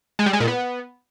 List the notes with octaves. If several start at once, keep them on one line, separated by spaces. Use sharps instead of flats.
G#3
G3
G#3
A#2
B3